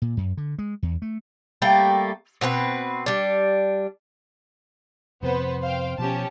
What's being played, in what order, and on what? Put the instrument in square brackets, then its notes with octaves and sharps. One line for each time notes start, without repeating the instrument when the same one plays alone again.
[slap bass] A#2
F#2
D3
G#3
E2
A3
[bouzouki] G3 A3 A#3 G5
B2 C4 D4 B4
G3 D4
[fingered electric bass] F2 C3 [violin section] B3 B4 C5
[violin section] C5 F5 G5
[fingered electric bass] B2 F3 [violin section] C#4 G4 A5